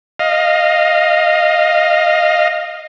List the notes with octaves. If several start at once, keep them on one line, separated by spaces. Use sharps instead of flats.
D#5 F5